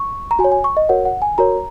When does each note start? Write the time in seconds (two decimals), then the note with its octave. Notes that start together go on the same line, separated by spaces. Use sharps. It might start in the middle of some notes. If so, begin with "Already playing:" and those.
Already playing: C#6
0.31 A#5
0.39 F#4 G#5
0.44 C#5
0.52 G#5
0.64 C#6
0.77 D#5
0.89 F#4 A#4 C#5 F#5
1.05 F#5
1.22 G#5
1.38 F#4 A#4 C#5 A#5